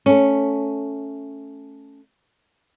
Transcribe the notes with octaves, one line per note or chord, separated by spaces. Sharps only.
A3 C#4